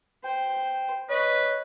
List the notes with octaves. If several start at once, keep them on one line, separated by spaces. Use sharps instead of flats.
C5 G5
B4 C#5 D#5